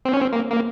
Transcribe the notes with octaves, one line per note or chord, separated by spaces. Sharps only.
C4
C#4
C4
A#3
A#3